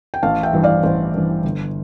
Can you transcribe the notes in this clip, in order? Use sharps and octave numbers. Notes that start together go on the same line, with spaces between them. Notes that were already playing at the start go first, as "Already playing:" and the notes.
G5
A1 F5 A5
E5 G5
G2 E3
D5 F5
A1 C5
G2 E3
G1